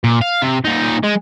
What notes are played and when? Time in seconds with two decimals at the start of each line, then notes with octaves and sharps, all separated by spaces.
0.04 A#2
0.21 F5
0.42 C3
0.64 A#2 D#4
1.03 G#3